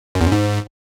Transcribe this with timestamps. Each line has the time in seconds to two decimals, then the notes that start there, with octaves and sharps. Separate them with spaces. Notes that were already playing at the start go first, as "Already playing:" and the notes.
0.15 F#2
0.21 E2
0.26 F#2
0.32 G#2